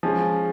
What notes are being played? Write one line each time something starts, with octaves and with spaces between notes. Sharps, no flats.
F3 G#3 C#4